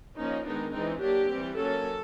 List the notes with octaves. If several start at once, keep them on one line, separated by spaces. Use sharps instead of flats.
F3 A#3 C#4 D#4
D#3 G#3 B3 D4 D#4
E3 G#3 C4 D#4
F#3 A#3 D4 G4
E3 G3 C4
F#3 A#3 C#4 A4